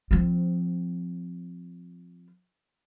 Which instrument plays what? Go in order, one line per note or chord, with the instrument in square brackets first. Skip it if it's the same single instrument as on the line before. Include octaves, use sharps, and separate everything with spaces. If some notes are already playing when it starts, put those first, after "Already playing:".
[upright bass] F3 C4